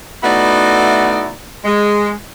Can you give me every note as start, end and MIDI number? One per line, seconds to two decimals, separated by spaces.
0.23 1.30 57
0.23 1.30 59
0.23 1.30 63
0.23 1.30 64
0.23 1.30 66
0.23 1.30 74
1.65 2.12 56